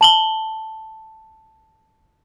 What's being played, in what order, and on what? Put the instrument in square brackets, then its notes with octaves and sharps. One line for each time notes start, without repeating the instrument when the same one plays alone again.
[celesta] A5 F#7 G7